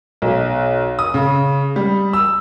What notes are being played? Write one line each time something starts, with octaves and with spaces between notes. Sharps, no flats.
B1
D#6
C#3
G3
E6